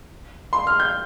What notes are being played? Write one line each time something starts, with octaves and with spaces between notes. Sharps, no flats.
C6
F6
G6